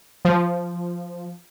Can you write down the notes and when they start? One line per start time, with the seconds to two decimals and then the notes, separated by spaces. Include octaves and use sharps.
0.25 F3